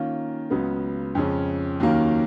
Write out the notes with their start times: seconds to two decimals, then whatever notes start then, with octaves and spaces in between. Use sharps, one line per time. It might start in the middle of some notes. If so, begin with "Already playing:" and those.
Already playing: D#3 A#3 C#4 F4
0.50 C#2 C#3 F#3 B3
1.15 F2 C#3 G#3 C#4
1.80 D#2 D#3 F#3 A#3 C#4